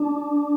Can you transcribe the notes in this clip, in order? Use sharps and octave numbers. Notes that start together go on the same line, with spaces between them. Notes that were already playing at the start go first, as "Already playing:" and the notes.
Already playing: D4